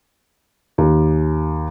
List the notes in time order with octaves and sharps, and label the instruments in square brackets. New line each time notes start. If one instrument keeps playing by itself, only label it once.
[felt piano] D#2